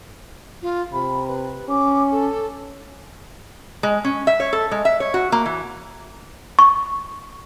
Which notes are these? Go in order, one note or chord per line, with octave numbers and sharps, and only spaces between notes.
F4
C3 B5
B4
C#4 D6
A4
G#3
C#4
E5
C#5
A4
G#3
E5
C#5
F#4
A#3
E3
C#6